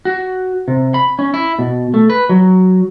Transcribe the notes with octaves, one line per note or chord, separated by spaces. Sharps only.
F#4
C3
B5
C#4
E4
B2
A3
B4
F#3